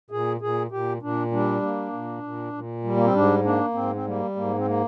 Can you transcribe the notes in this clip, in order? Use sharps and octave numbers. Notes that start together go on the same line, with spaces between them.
A#2 G#4
A#2 G#4
A#2 G4
A#2 D4
G3 D4
A#3
A#2
A#2
A#2
G3
A#3
C4
G#2 D4
A#3 D4
G#2 C4
C4
G3 A#3
G#2 A#3
C4
A#3